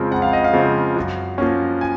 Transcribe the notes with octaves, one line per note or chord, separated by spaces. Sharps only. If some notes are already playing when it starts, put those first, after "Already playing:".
Already playing: F2 C#3 F3 G#3 C4
F2 F#5
F5
D#5
F5
C#3 F3 G#3 C4
F#2
F3 A#3 C#4
G#5